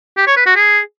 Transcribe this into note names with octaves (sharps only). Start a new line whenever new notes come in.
G4
C#5
B4
F#4
G#4